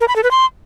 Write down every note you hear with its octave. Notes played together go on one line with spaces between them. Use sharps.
A#4
B5
A4
B4
C6